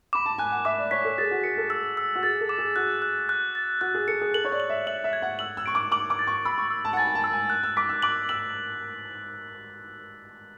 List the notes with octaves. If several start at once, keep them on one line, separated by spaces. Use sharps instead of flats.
B5 D6
A5
G#5 F#6
F#5
E5 D6
D5
C#5 B6
A4
G#4 A6
F#4
G#4 C#7
A4
E6
E6
F#4
G#4 A6
A4
D6
G#4
F#4 F#6
F#6
F#6
A6
F#4 F#6
G#4
A4 C#7
G#4
A4 F#7
C#5
D5
F#7
E5
E5 F#7
E5
G#6
F#5
E6 F#7
E6
C#6 D7
D6
D6 F#7
D6
A6
C#6
B5 E6
C#6
E6
A5
F#5
G#5 A6
G#5
A5
E6
G#5
F#6
E6
D6 B6
E6
D6 F#7
E6 F#7